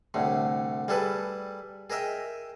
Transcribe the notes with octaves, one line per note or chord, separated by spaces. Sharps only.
C2 A2 D3
G3 G#4 A4 B4
G#4 A#4 D#5 E5 G5